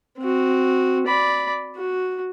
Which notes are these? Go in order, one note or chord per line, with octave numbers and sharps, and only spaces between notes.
C4 F#4
D5 B5
F#4